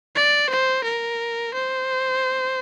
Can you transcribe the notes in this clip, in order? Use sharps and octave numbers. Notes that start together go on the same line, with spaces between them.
D5
C5
A#4
C5